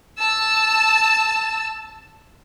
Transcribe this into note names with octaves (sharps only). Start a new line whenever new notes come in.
A5 E6